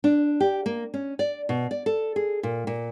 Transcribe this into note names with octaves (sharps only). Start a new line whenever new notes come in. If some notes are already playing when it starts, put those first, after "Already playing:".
D4
G4
A#3
C#4
D5
B2
D5
A4
G#4
A#2
A#2